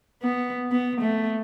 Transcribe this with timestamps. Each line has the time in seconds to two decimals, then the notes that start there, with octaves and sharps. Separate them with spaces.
0.23 B3
0.72 B3
1.01 A3